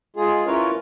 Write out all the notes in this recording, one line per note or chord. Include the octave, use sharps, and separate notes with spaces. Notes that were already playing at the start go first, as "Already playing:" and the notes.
G#3 F4 G#4
C#4 E4 F4 A#4 B4 C#5